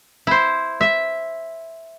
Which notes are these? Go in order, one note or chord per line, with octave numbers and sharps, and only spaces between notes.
E4 C5
E5